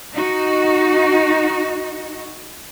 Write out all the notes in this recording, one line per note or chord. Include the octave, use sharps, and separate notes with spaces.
D#4 F#4